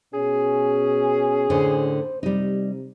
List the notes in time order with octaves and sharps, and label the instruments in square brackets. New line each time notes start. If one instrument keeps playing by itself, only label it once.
[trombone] B2 [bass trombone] C#4 [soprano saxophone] G#4
[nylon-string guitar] A2 D3 [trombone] C5
[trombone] C3 [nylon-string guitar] G3 D#4